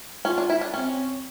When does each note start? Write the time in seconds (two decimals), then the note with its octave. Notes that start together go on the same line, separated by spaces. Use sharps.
0.25 C#4 F4
0.38 D4
0.50 E4
0.61 D4
0.74 C4 C#4